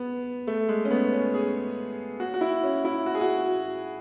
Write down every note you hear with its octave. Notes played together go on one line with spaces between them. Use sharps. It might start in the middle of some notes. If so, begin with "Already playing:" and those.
Already playing: B3
A3
G#3
C#4
B3
C#4
G#4
F#4
F#4
E4
C#4
E4
F#4
G#4
F#4